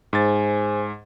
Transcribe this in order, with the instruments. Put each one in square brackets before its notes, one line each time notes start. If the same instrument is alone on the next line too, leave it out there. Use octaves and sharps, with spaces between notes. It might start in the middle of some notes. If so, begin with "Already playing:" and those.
[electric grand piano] G#2 A6 [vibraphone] G#4 C5 G#5